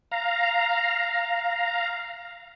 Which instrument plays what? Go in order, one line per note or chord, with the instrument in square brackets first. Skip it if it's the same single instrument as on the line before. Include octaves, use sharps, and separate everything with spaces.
[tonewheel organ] F5 A#5